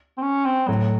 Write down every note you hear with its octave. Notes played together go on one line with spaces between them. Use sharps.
C4
C#4
C4
A2 F#3